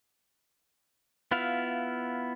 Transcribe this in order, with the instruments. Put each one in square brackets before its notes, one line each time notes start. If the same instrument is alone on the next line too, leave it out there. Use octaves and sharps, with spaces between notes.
[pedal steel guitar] B3 E4 F4 F5